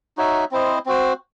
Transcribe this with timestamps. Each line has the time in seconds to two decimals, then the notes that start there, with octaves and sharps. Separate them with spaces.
0.17 D#4 F#4 C#5 E5
0.51 C4 E4 C5 D#5
0.86 C4 F#4 C5